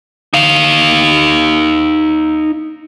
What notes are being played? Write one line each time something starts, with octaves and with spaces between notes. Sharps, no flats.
D#4 F5